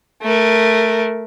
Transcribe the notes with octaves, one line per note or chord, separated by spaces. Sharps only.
A3 A#4